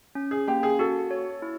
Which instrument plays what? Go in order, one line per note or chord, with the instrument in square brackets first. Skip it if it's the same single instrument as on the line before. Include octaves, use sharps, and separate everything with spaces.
[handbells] C#4
[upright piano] G#4
[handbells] A#3 [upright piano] G4
[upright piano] G#4
[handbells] F#4 [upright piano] A4
[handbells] C#5
E4